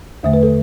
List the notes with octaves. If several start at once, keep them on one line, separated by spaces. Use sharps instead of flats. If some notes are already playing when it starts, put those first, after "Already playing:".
E2 D3 A3 E5
B4
A4